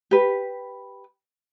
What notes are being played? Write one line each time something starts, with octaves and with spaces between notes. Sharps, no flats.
G4 B4